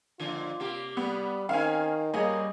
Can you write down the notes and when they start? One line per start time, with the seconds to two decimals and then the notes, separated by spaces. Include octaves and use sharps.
0.20 F2 A#2 D3 F4
0.60 C3 A#3 G4
0.97 G3 B3
1.49 D#3 C4 C#4 F5 G#5
2.14 G2 A#2 A#3 G#4 C#5 D#5